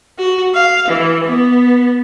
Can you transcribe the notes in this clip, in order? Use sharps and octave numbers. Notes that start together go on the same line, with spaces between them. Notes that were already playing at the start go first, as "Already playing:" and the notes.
F#4
F5
E3
B3